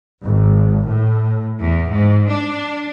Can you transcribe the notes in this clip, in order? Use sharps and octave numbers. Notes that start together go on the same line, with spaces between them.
G#1
A2
E2
G#2
D4